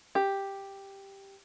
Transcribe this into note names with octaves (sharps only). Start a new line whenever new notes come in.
G4